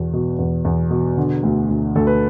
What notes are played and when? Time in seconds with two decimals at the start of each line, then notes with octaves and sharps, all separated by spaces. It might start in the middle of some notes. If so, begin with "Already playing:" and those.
Already playing: E2 B2 F#4
0.13 B2
0.38 E2
0.65 E2
0.91 B2
1.17 D3
1.43 D2
1.69 D2
1.95 D2 A4
2.07 B4